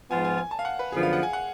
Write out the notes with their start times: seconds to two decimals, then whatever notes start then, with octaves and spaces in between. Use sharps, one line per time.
0.10 G#2 F3 B3 F4 G#5
0.25 G#5
0.38 G#5
0.51 A5
0.59 F5
0.65 F#5
0.79 B4
0.92 F#2 D3 F3 B3 G#4
1.03 F5
1.13 F#5
1.23 G#5
1.33 F#5